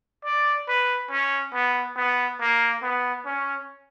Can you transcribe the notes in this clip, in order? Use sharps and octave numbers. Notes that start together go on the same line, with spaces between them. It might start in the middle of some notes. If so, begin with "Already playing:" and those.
D5
B4
C#4
B3
B3
A#3
B3
C#4